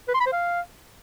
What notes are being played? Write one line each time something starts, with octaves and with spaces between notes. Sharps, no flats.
B4
C6
B5
C5
F5